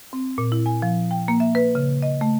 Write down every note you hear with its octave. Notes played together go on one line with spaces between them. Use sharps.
C4
A#2
E4
G#5
F3
G5
A#3
E5
B4
C#3
D#5
A3